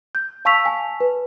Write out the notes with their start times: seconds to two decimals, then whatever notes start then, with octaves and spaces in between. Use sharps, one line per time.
0.15 G6
0.45 F5 A5 C#6 E6 B6 F7
0.66 G#5 A5
1.00 B4